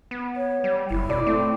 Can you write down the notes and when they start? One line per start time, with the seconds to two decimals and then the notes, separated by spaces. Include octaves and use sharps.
0.11 B3
0.37 C#5
0.64 G3
0.91 F#1 E4
1.09 B2 D5
1.27 A3 C4